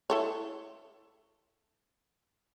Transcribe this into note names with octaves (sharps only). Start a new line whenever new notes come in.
E4 A4 C#5